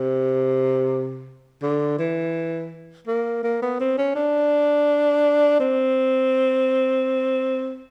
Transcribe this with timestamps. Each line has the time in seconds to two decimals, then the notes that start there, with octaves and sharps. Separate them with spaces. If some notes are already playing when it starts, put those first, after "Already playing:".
Already playing: C3
1.62 D3
1.99 E3
3.08 A#3
3.44 A#3
3.62 B3
3.80 C4
3.98 C#4
4.15 D4
5.60 C4